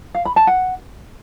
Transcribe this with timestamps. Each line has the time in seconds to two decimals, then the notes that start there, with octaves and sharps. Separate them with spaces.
0.15 F5
0.25 B5
0.36 A5
0.47 F#5